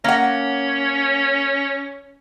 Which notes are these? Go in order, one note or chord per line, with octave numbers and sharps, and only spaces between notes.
A#3 C#4 F#5